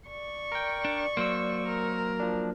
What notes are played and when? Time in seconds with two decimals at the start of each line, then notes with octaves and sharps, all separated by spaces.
0.10 D5 C#6
0.52 A#4 G5
0.85 D4
1.17 F#3 A#3 C5 E6
1.67 A#4
2.20 F3 D4